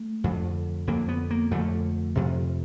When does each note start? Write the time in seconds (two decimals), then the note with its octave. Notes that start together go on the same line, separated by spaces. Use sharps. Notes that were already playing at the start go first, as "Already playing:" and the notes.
Already playing: A3
0.24 F2 D3
0.87 F2 D3 A#3
1.09 B3
1.31 A#3
1.51 F2 D3 A3
2.15 F2 C3